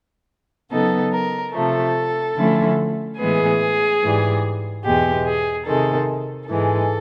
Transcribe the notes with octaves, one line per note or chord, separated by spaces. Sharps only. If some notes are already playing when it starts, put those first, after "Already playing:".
C#3 F#3 B3 D#4 A4
A#4
C3 F3 A3 A4
D3 F3 A3 C#4 E4
A2 E3 G#3 B3 G#4
G#2 E3 G3
E2 B2 G#3 G4
G#4
C3 D#3 G#3 A4
G#2 E3 G#3 A4